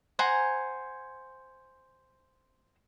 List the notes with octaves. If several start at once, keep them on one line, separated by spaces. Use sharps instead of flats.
C5 F#5 G#5 A#5